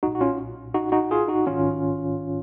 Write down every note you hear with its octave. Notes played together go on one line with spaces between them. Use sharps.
B1 A#2 D#4 F#4
F#4
C#4 F4
D#4 F#4
D#4 F#4
F4 G#4
D#4 F#4
A#1 G#2 D#3 C#4 F4